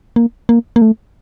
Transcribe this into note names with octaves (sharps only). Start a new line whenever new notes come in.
A#3
A#3
A#3
A3